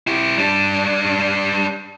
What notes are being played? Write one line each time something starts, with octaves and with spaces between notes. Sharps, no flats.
E4 G4
G3 D4